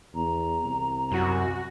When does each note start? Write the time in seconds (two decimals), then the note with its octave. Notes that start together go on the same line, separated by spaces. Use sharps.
0.14 E2 A#5
0.64 C2
1.12 F#2 F#4